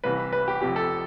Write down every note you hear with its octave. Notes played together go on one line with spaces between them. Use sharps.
C2 C3 E3 B4
B4
G4
F1 F2 C3 G4
A4